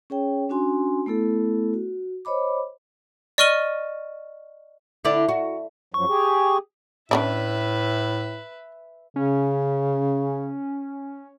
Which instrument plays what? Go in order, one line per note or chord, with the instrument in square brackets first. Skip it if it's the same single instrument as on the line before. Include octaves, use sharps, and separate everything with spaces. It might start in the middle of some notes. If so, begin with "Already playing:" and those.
[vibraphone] C#4 G#4 C#5 G5
C#4 D4 F#4 G#5 C6
A3 B3 E4 A4
F#4
C5 C#5 D#5 B5 D6
[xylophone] D5 D#5 C#6 F6 D#7 G7
[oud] D3 E4 D5
F#4
[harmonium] F#2 F3 F#3 [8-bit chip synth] C#6
[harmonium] G4 G#4
[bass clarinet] A2 [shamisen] C#4 D4 E4 [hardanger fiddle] B4 E5
[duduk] C#3 [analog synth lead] C#4